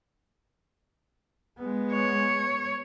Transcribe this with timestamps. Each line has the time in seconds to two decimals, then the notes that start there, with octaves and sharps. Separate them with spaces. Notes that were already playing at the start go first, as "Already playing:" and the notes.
1.58 G#3 B3
1.93 C#5